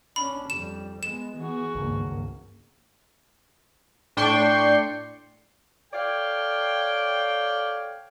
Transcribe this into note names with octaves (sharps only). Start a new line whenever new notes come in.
C#4 D4 B5
F2 G3 E7
G#3 B3 E7
E3 B3 F#4 G#4
G#1 C#2 G2 C#3 A#3
A2 D4 G5 C6 C#6
A4 C#5 D5 F5 G5